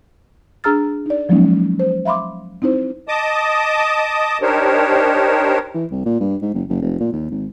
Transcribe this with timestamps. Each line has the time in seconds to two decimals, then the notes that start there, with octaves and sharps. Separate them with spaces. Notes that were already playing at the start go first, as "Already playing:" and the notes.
0.64 D4 G#4 A#5 E6 F6 A6
1.06 D#4 D5
1.29 F3 F#3 G#3 A#3 C#4 D#4
1.79 C5
2.05 E5 F5 B5 C6 D6
2.62 C4 D#4 E4 C5
3.08 D#5 A5 D6 D#6
4.42 D4 D#4 G4 A#4 C5 C#5
5.74 E3
5.91 C2
6.06 A#2
6.20 G2
6.42 G#2
6.54 F#1
6.69 F#1
6.82 F1
7.00 A#2
7.13 D#2
7.31 G#1